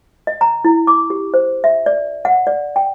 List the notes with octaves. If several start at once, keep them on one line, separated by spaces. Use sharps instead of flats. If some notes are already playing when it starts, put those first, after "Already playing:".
D#5
A#5
E4
D6
G4
C5
E5
D5
F#5
D5
G5